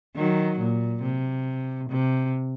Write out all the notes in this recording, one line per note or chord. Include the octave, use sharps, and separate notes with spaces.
D#3 F#3
A#2
C3
C3